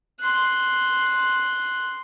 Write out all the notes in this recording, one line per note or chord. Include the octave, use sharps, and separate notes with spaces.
C6 F#6